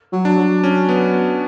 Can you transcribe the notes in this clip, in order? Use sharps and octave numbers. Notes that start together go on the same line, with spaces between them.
F#3
D4
F#3
C#4
B3